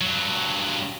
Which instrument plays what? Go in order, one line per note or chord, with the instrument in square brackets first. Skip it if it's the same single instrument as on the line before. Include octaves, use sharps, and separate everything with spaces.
[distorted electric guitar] G2 F#3